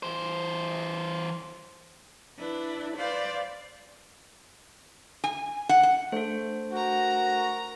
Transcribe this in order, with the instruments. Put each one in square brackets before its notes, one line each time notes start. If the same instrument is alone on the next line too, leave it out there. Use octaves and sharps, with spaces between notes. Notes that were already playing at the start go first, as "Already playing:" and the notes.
[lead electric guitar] E3 C5
[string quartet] D4 E4 B4
B4 C5 D5 F5
[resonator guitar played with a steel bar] G#5
F#5
F#5
[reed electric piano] A3 D4 [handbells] A4 C5
[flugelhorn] F#4 [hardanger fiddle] A#4 A#5